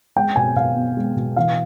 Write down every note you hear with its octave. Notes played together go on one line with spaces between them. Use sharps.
G#3 G5
B2 G#5
B2 F5
B3
G#3
B2
E3 F5